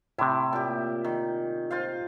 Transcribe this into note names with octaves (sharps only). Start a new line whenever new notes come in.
A2 C3 E4
A#2 G4
D#3
F4 C5 F5